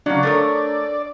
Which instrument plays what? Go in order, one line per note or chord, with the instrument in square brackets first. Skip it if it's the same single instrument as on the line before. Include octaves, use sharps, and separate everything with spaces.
[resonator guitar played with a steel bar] C#3 F#3 [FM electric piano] D4 [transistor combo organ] D5
[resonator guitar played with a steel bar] A3 A#4 C#5 [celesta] A4 A6